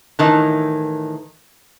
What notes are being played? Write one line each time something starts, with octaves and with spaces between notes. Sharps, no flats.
A2 D#3 E3